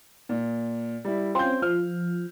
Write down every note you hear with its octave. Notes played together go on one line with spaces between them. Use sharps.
A#2
G3 E4
C4 C#4 F4 C6 G6
F3 F6